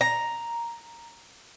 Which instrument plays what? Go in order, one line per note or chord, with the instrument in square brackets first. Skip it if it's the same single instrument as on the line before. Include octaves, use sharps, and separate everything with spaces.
[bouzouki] A#5